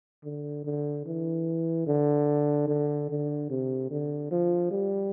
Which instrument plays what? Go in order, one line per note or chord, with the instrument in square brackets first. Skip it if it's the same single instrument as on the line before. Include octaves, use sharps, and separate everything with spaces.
[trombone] D3
D3
E3
D3
D3
D3
C3
D3
F3
G3